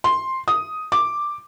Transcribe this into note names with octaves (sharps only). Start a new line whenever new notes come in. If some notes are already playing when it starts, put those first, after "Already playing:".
C6
D#6
D6